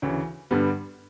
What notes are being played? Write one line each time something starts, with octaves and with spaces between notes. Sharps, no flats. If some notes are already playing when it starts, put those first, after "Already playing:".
D2 C#3 E3
G2 D3 G3 B3